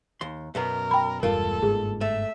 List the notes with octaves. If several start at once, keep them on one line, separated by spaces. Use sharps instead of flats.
D#2 C6
F#2 B2 B3 A#4
G5 B5
E1 G2 A#3 F4 A4 A#4
G1 G#2 G#4
A3 E5